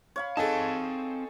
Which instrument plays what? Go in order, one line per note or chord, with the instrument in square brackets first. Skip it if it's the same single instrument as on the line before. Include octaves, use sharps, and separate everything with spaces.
[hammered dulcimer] C#5 F5 B5
[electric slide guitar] C4 A5 [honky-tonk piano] D#4 G#4 A4